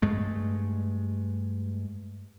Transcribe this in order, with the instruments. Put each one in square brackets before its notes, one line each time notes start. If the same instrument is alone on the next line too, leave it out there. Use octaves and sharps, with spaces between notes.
[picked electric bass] G2 G#3 A3